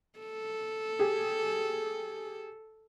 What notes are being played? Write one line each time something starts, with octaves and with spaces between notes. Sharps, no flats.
A4
G4 G#4